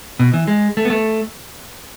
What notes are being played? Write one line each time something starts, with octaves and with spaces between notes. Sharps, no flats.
B2
E3
G#3
A3
B3
A3